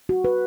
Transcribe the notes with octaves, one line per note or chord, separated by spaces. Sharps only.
F#4
B4